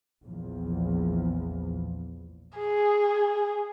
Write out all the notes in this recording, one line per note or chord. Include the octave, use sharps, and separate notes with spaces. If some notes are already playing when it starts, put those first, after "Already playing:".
A#1 E2 F3
G#4